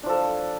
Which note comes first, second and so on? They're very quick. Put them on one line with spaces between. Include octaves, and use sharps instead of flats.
D4 F3 A4